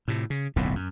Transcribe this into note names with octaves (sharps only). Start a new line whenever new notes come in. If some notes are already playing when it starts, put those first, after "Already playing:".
A2 C3
C#3
D1 B1 F2 A2
F#2